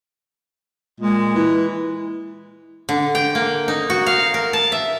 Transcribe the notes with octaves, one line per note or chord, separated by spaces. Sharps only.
A#2 G#3
E3
D3
G5
A#3
D#4
F#4
F5
A#4
A5
E5